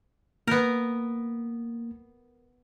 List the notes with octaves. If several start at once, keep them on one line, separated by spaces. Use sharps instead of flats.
A#3 B3 A#4